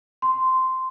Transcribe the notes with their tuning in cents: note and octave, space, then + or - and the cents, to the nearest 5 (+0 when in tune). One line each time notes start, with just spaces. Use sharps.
C6 -10